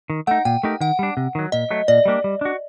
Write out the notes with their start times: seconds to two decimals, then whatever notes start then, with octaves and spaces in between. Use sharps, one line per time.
0.10 D#3
0.27 A3 D#4 F#5
0.45 A#2 G5
0.63 A3 D#4 G4 A#4
0.81 D#3 F#5
0.99 G3 D4
1.17 C3
1.35 D#3 F#3
1.52 A#2 D#5
1.71 F#3 A3
1.88 A#2 D5
2.05 G3 A#3 D4 G4
2.24 G3
2.41 D4 F#4